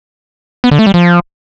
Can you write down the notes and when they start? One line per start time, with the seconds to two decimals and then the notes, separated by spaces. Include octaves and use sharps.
0.64 B3
0.71 D3
0.79 A3
0.86 G3
0.94 F3